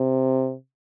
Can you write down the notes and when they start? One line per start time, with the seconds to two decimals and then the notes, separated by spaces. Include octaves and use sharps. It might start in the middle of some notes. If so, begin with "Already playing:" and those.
Already playing: C3